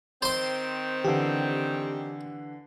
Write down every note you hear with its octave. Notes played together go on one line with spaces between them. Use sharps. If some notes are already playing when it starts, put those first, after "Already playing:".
D#3 C4 C5 C6
D3 E3 G4